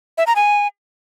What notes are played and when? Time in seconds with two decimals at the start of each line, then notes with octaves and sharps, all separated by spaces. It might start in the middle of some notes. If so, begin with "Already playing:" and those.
0.18 E5
0.27 A#5
0.36 G#5